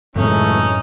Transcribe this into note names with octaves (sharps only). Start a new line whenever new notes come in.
C#2 F#2 A2 E3 A3 C4 C#4 D#4